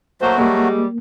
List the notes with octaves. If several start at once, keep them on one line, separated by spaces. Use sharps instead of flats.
F#3 A3 A#3 F#4 C5
G3 G#3 A#3